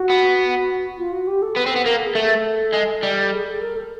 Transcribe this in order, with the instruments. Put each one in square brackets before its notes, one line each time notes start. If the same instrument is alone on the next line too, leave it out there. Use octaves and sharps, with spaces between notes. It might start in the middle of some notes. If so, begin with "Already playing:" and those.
Already playing: [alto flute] F#4
[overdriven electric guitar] B3
[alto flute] F4
F#4
G4
A4
[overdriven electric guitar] B3
C4
B3
[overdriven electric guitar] A#3 [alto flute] A#4
[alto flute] A4
G#4
[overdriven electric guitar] A3 [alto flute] A4
[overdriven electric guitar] G#3
G3
[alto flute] G#4
A4
A#4
A4